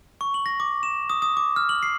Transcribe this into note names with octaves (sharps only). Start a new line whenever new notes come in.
C#6
F#7
A#6
D6
E7
D#6
D#6
D6
F6
F#7
C7